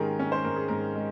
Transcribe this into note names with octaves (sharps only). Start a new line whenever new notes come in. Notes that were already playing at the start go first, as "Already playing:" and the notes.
Already playing: G#2 D#3 G#3 C#4 G4 G#4 A#4
C#4
C5
G#2 A#4
G#4
G#2 A#4
G#3